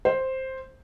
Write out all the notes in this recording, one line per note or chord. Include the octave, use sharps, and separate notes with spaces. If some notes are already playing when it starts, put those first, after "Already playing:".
C5